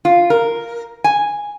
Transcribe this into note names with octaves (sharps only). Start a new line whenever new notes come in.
F4
A#4
G#5